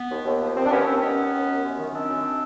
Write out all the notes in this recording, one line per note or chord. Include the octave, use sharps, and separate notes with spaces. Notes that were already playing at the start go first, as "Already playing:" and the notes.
Already playing: B3
D#2
D#2
F3
D#2 C4
D4
D#2 B3 C#4
D#3 C4
D#3 B3 C#4
D#2
D#2
F#2
F#2
D#3
D#3 C4 D4
F#2